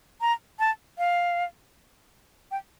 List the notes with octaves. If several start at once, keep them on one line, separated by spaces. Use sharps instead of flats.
A#5
A5
F5
G5